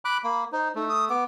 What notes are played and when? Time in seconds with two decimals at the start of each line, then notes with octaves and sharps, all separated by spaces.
0.05 B5 D6 F#6
0.24 A#3 B5
0.52 D#4 C5
0.75 A3 D#4
0.88 D#6
1.09 B3 D6